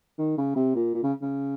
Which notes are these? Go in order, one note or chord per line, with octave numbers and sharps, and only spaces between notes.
D#3
C#3
C3
A#2
A#2
C#3
C#3